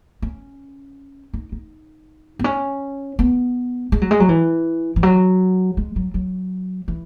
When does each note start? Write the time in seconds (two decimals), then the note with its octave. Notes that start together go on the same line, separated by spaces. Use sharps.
0.22 C#4
1.34 D#4
1.52 D#4
2.39 B3
2.44 C#4
3.19 B3
3.92 G#3
4.01 F#3
4.11 G#3
4.20 F#3
4.29 E3
4.96 E3
5.03 F#3
5.77 G#3
5.96 F#3
6.14 F#3
6.88 E3